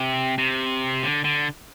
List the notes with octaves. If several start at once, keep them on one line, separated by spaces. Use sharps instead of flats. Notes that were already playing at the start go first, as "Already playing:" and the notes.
Already playing: C3
C3
D3
D3